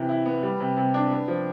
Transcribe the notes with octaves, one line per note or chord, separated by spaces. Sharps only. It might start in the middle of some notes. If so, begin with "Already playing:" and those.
Already playing: C3 E3
E4
B3
G3
C3
C3
D4
B3
F3